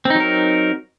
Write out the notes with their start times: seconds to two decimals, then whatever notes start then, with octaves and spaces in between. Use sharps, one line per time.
0.05 C4
0.10 D#4
0.15 F#3
0.20 A#4